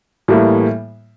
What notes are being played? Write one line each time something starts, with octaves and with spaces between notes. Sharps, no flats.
A2 E3 G3 A#3